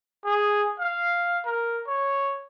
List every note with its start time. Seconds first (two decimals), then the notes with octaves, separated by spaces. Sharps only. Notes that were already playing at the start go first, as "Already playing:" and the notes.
0.25 G#4
0.80 F5
1.45 A#4
1.87 C#5